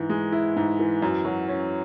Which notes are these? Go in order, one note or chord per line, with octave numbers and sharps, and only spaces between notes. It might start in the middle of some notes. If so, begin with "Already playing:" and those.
Already playing: G#2 E3
G#3
E4
G#2
E3
F#2
F#3
C#4